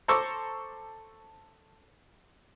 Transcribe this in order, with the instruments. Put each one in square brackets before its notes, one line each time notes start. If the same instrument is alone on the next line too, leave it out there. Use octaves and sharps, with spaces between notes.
[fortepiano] A4 C5 A#5 C#6 D6 E6